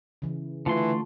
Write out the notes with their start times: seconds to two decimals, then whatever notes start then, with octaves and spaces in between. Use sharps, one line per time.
0.22 C#3 E3
0.66 D3 E3 A3 F4 C6